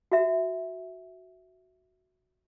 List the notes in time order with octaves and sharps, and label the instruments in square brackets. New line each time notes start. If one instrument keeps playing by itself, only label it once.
[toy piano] F#4 E5